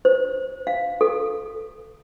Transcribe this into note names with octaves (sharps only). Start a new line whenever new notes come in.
C5
F5
A4